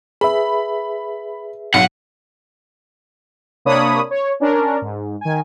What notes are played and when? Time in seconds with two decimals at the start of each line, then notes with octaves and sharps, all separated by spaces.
0.21 G#4 B4 E5 B5
1.74 B1 F#5
3.65 C3 A#3 D4 C#5 B5 D#6
4.11 C#5
4.40 C#4 D4 A#4
4.82 G#2
5.21 D#3 G#5